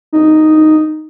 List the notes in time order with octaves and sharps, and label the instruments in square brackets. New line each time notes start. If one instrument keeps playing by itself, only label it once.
[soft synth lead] D#4